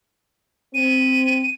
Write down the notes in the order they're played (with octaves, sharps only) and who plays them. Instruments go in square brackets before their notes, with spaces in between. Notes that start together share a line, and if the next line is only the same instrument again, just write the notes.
[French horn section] C4 [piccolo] D#7